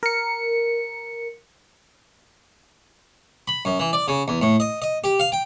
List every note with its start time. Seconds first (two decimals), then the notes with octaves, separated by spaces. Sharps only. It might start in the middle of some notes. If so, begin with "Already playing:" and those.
0.03 A#4 C#7
3.48 B5
3.65 F#2
3.80 E3
3.93 D5
4.08 C#3
4.28 E2
4.42 A2
4.60 D#5
4.82 D#5
5.04 G4
5.20 F5
5.32 G5